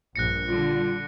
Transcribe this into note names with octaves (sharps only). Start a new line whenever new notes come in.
A#1 G2 F#6 A#6 C#7
D3 G3 F4